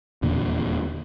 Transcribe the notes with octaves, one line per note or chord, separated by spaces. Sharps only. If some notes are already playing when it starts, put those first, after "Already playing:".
D#1 E2 A#2 D3